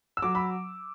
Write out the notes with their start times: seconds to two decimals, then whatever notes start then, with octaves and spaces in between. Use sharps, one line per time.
0.17 E6
0.22 F#3 D6
0.35 B5